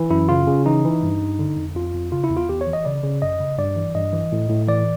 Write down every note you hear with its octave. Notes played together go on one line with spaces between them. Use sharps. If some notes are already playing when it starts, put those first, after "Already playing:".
Already playing: E3
F#2 E4
C#3 F4
C#3
E3 D#4
E3
G2
G2
D3
F2
F2 F4
F2
C#3 F4
E4
E2
F4
E2 G4
C#5
E3
D#5
C#3 D5
C#3
F#2 D#5
C#3
G2 D5
E3
G2 D#5
E3
A2
A2
E3 D5